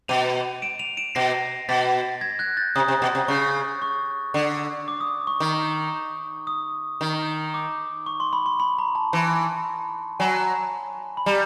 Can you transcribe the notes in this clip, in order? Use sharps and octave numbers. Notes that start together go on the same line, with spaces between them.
B2 D#7 F7
D7 E7
D#7 F7
D7 E7
B2 A#6 C7
B2 A6 B6
G#6 A#6
F#6 G#6
G6 A6
C3 D#6
C3
B2
C3
C#3 C#6
C#6
D3
D6
D#6
C#6
D#3
D#6
D#3
D6
C#6
C6
B5
C6
B5
A#5
A5
E3
F#3 G#5
B5
G3 A#5